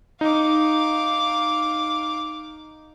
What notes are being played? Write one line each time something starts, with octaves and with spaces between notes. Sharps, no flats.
D#4 F5 D6